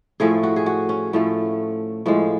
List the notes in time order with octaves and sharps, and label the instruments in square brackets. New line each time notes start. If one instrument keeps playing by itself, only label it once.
[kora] A2 F3 A3 G#4
F#4
G#4
F#4
C#4
A2 F3 A3
A2 F3 G#3